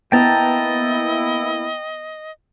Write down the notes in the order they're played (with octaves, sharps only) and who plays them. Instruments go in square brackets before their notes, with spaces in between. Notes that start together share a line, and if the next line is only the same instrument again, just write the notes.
[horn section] A#3 E4 [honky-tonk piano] B3 [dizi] D#5 [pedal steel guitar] G5 A5 A#5